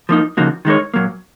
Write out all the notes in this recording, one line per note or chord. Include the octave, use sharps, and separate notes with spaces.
F3 A#3 D#4
C#3 F3 A#3 D#4 F#4
D#3 G#3 D#4 A#4 C#5
A#2 F#3 A#3